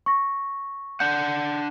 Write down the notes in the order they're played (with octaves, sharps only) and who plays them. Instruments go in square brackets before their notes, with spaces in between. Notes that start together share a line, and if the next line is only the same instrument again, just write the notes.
[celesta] C#6 A#6
[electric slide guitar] D4 F#5 [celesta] G6